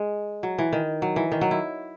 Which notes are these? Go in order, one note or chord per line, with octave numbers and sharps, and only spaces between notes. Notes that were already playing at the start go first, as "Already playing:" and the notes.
Already playing: G#3
F#3
E3
D#3
F#3
E3
D#3
F#3
E4